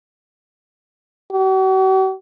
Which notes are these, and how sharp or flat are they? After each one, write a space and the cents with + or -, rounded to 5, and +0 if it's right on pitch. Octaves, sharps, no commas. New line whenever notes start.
F#4 +45